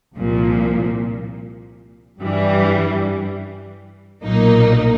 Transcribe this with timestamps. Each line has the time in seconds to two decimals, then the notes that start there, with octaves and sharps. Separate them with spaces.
0.15 C2 A#2 F3
2.19 G2 E3 G3
4.23 B1 A#2 F#3 A#3 D#4